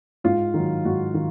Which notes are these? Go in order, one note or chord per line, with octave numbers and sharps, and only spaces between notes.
G#2 F4
D#3 F#3
G#2 F#4
D#3